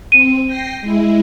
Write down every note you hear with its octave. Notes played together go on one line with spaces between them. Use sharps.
C4 D#7
G5 A#6 C7
G#3 E4